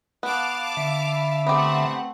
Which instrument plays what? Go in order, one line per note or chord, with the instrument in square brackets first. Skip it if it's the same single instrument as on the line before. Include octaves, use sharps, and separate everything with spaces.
[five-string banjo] B3 [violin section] F5 A5 D6 [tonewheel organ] F#6
[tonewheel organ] D3 E5 B5
[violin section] A3 F#5 [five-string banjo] B3 G4 [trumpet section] C4